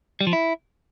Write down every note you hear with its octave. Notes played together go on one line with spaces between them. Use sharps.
G3
F3
E4